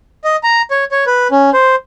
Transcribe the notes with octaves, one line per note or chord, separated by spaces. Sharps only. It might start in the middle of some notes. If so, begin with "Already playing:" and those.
D#5
A#5
C#5
C#5
B4
C#4
C5